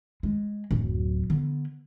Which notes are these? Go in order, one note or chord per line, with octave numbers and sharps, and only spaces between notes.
G#3
D1 F#2
D3 B3